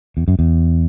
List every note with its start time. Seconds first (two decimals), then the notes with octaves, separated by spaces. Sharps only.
0.17 E2
0.28 F#2
0.39 E2